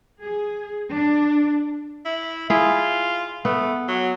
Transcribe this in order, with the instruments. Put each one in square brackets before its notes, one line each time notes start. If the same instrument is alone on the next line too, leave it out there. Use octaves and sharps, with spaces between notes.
[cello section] G#4
D4
[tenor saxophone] E4
[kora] E4 G#4 [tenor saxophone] F4
[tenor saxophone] A3 [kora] B3
[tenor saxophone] F#3